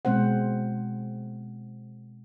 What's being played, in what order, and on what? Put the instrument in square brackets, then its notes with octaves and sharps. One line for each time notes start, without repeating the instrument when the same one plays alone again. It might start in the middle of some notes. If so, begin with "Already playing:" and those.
[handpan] B2 G#3 C4 C5 F#5